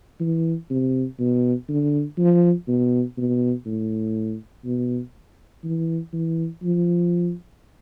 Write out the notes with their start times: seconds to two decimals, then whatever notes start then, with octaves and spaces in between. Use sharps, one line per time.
0.20 E3
0.70 C3
1.19 B2
1.69 D3
2.18 F3
2.68 B2
3.18 B2
3.66 A2
4.65 B2
5.64 E3
6.13 E3
6.63 F3